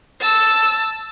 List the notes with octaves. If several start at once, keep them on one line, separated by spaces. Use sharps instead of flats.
A5 E6